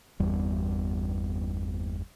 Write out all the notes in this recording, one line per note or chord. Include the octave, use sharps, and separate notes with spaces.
G1 E2 G3